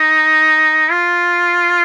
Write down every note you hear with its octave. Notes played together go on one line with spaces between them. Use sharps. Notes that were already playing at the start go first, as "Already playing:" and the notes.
Already playing: D#4
F4